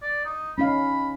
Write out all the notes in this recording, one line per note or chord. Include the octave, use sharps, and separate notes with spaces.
D5
D#4
C#4 D#4 F5 B5